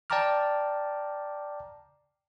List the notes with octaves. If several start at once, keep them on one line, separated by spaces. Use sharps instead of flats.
D5 G5 A5 A#5 D6 F6